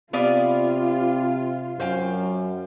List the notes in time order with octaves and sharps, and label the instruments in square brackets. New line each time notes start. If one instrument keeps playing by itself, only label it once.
[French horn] C3 [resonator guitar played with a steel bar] B3 D5 F5 [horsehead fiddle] F4
[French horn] F#2 [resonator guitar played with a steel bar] C5 F5 G5